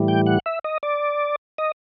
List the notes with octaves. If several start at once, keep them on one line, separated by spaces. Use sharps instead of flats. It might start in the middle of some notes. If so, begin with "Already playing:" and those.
Already playing: A2 E3 G3
G5
F#5
E5
D#5
D5
D#5